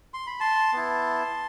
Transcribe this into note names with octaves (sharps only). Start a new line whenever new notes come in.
C6
B5
A5 C6
B3 E4